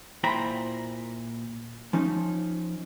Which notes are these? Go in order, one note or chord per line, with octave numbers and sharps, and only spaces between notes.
A#2 E4 C5 G5 A#5 B5
F3 C#4 D#4